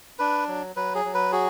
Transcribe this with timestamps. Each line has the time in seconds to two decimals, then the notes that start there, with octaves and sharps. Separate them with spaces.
0.19 D4 B4
0.48 F#3
0.76 F#3 B4
0.95 G#4
1.05 F#3
1.14 B4
1.32 F#4 G#4